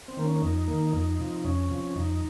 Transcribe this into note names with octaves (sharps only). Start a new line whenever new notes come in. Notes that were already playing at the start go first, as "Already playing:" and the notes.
C4
D#3 A#3
C#4
C#4
F2 D#4
D#3 A#3
F2 D#4
C3 F3
F2 C#4
C3 F3
F2 D#4